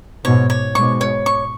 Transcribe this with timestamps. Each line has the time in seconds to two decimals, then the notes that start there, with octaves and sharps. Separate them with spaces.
0.24 G#2 B2 C#5
0.50 C#5
0.75 G#2 B2 C#6
1.01 C#5
1.26 C#6